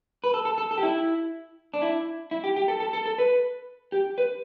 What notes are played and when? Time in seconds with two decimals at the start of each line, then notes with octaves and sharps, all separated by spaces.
0.24 B4
0.34 A4
0.45 A4
0.58 A4
0.71 A4
0.78 G4
0.83 E4
1.74 D4
1.82 E4
2.31 E4
2.44 G4
2.56 G4
2.68 A4
2.80 A4
2.93 A4
3.06 A4
3.18 B4
3.92 G4
4.18 B4